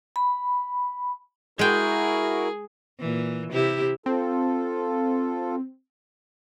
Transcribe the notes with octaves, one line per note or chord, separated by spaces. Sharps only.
B5
G#3 E4 F#4 G#4 A#4 G5
A#2 E3
C3 E4 G4
C4 F4 A4